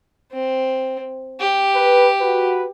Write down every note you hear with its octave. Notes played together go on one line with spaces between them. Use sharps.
C4
G4
B4
F#4 B4